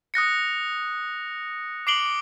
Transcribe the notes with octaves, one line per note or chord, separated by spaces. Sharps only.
D#6 F#6 A#6 C#7
D6 C7 D7 F#7 G7